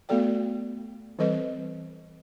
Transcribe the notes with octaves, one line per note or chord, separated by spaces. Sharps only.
A3 B3 F#4 A4 D5 G5
E3 G3 C4 A4 B4 D#5